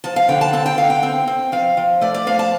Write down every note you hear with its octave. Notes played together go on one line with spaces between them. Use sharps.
F3 A5
F5
D3 G5
A5
C4 A5
G5
D3 F5
G5
C4
C4
F3 F5
F3
A3 D5
D5
F3 F5
A5